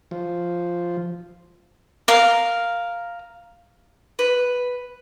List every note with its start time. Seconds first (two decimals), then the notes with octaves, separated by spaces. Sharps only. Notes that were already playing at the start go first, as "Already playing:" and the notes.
0.11 F3
2.08 A#4 F5
4.19 B4